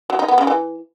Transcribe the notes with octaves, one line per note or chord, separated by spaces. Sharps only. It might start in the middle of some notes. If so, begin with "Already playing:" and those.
F#3
D#4
B3
C#3
E3